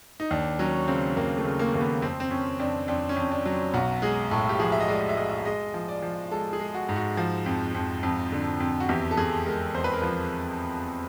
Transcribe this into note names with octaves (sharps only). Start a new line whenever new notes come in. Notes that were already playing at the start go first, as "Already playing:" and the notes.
D#4
D#2 D4
F#3 C#4
C#3 C4
D#2 A#3
A3
C#3
A#3
D#2 A#3
B3
F2 C4
C4
F2 C#4
F2 D4
F2 D4
C#4
F2
D4
F#3
B1 F#4
G#3 G#4
A2 A4
G4
F3 G#4
E5
D#5
G#3 D5
E5
G#3 D#5
G#3 D#5
F3
D5
F3
G#3 A4
G#4
G#3
F#4
G#2
F#4
F3
F2
F2
F2
D3
F2
F#4
E2 G4
A4
E2 G#4
G#3 A#4
E2 C5
B4
A#4
F3 B4